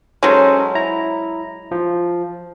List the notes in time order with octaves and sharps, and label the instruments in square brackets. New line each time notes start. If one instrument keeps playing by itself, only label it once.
[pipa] F#3 G#3 [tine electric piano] C#4 A4 C5
[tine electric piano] E4 A#5
F3